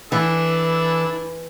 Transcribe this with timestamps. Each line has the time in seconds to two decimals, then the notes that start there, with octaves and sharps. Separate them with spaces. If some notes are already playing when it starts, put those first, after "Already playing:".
0.12 E3 D4 E4 A4